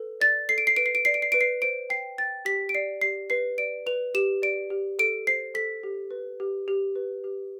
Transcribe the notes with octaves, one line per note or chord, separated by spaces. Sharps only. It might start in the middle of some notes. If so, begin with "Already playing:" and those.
Already playing: A4 B4
D5 A6
A4 C7
D7
C7
B4 D7
C7
D7
D5 C7
D7
C7
B4 D7
C7
C5 D7
G5 C7
G5 A6
G4 B6
D7
D5 C7
G4 C7
B4 C7
D5 D7
B4 F7
G4 E7
D5 D7
G4
A4 D7
C5 C7
A4 B6
G4
B4
G4
G4
B4
G4